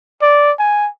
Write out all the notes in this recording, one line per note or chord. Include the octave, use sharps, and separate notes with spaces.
D5
G#5